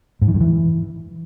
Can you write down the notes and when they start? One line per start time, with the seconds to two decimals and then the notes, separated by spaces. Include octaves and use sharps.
0.22 G#2
0.28 E3
0.34 G2
0.41 E3